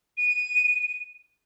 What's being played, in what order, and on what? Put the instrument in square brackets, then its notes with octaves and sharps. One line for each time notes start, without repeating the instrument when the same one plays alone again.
[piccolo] D#7